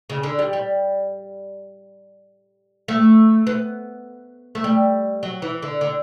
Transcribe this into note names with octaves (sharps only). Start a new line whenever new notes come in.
C#3
D3
G3
G3
A3
B3
A3
G3
F#3
E3
D3
D3